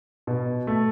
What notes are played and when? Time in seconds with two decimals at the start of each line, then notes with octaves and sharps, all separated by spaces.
0.27 B2
0.67 A3